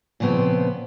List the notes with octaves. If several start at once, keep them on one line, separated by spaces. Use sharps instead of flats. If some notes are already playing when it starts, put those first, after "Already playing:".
A#2 C#3 F3 B3 C4